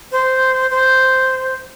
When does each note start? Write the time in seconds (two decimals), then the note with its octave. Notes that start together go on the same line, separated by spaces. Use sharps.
0.12 C5
0.71 C5